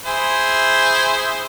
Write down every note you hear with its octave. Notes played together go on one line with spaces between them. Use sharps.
E4 G#4 C5